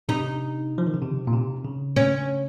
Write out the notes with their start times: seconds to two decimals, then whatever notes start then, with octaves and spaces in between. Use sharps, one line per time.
0.09 C3 D#4
0.78 F3
0.86 D#3
0.94 C#3
1.02 C3
1.27 A#2
1.34 C3
1.65 C#3
1.96 C#4